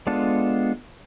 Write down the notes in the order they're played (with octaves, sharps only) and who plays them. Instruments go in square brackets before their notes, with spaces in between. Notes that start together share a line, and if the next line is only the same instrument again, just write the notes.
[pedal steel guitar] G#3 B3 D4 F4 A4